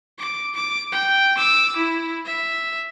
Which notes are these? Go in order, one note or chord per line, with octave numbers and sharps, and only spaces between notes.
D6
D6
G5
D6 E6
E4
E5